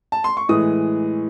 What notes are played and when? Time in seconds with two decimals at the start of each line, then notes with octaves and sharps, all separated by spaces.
0.12 A5
0.24 C6
0.37 C#6
0.49 A2 E3 G#3 D#6